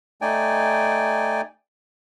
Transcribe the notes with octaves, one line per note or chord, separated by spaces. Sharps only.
A3 D#4 D5 G5 G#5